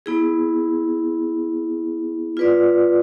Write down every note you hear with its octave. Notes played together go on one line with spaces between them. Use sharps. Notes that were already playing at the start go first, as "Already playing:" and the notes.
B3 E4 G#4
F4 B4 D5